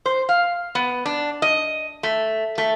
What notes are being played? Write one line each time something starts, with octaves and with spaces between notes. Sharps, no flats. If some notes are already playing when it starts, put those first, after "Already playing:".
C5
F5
B3
D4
D#5
A3
A3